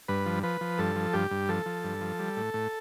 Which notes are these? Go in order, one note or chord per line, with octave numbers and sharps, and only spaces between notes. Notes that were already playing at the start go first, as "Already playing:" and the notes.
G2 B4
F3
F3 B4
F3
G2 A4
F3
G2 G4
G2
F3 A4
F3
G2
F3
G3
A2
A2